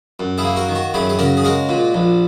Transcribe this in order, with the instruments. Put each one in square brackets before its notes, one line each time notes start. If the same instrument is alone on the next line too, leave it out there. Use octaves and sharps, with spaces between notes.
[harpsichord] F#2
E4 G#4
A#3
F#4 A#4
D#3
F#4
F#2 E4 G#4
G#4
C#3 F#4 A#4
G#4
G#3 F#4 A#4
A#2
A#1